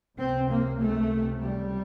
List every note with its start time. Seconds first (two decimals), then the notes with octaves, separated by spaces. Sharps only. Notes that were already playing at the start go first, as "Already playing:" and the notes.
0.19 C#2 C3 C4
0.50 A#3
0.80 A3
1.41 G3